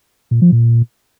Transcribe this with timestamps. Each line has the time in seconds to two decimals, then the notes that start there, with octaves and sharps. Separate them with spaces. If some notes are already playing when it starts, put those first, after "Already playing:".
0.31 A#2
0.42 F3
0.52 A#2